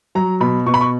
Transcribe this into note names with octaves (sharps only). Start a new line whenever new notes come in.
F#3 A#5
B2 B5
B2 C#6
B5
C#6